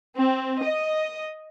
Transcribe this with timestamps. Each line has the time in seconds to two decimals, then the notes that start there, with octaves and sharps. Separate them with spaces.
0.17 C4
0.63 D#5